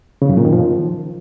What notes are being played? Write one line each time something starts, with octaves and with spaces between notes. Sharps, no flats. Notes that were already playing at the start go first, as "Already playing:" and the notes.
C#3
F#2
A#2
D#3
F3